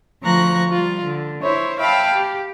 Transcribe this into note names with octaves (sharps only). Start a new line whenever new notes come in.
D2 F3 A#5 C#6 F#6 A#6
G3 F4
D3
E4 C5 C#5
E5 F5 G5 A5 B5
G4